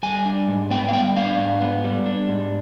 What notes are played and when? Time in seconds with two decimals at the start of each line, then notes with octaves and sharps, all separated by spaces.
0.03 G3 G#5
0.26 D4
0.48 G#2
0.70 B3 G5
0.89 F5
0.93 G3 G5
1.16 D4 F5
1.38 G#2
1.61 B3
1.84 G3
2.06 D4
2.29 G#2